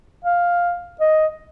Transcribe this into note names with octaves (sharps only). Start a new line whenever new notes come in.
F5
D#5